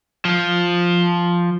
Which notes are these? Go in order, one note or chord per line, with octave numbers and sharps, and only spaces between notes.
F3